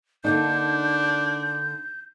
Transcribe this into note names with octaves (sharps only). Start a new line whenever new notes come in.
D3 A#3 D4 D#4 G6